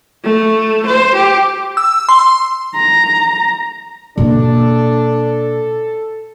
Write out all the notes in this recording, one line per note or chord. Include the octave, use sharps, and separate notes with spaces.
A3
C5
G4
E6
C6
A#5
B2 A#3 D4 A4